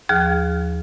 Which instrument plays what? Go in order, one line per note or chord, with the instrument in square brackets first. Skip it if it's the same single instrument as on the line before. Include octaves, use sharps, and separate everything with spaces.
[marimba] D#2 F3 G#4 F6